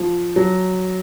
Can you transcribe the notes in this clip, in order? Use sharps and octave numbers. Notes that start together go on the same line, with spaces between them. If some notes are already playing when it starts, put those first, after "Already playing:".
Already playing: F3
F#3